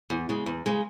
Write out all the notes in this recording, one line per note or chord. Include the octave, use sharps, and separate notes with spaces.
E2
C#3 G#3
E2
C#3 G#3